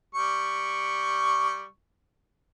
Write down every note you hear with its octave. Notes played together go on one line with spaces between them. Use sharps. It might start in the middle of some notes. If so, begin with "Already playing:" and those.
G3 C#6